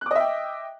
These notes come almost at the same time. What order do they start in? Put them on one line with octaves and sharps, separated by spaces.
F#6 D6 D#5 E5 G5